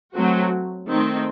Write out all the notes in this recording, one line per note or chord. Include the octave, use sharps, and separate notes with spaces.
F#3 A3 C4 F#4
D#3 A3 C4